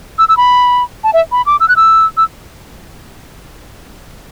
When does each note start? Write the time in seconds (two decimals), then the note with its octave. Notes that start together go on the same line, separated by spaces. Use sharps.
0.19 E6
0.29 E6
0.37 B5
1.04 A5
1.13 E5
1.32 B5
1.46 D6
1.60 E6
1.69 F#6
1.76 E6
2.17 E6